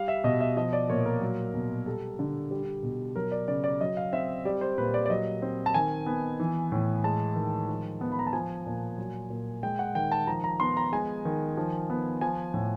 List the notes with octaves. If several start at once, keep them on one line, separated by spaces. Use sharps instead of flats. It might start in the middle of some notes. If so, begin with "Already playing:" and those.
Already playing: G3 F5
E5
B2 D#5
E5
F3 D#5
D5
A#2 C#5
A#4
F#3
B2
G3 A4
D3
G3
B2
F#3 A#4
D5
C#3 D5
D5
F#3 D#5
F5
C4 E5
G3 D5
C5
A#2 B4
D5
D5
F#3 D#5
C4
A5
D#3 G#5
B3
E3
A2
G#3 A5
D#3
F3
B3
B5
A#5
A5
F3 G#5
A#2
F#3
A#2
G#3 G5
F#5
D#3 G5
A5
F3 A#5
A#5
B3 C6
A#5
G#3 G#5
D#3
F3
B3
F3 G#5
A2